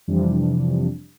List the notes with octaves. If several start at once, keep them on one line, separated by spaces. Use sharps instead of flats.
F2 C3 E3 F3 G3 D4